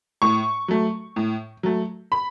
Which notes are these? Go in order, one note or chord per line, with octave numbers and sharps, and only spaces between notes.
A2 C#6
F#3 A3
A2
F#3 A3
B5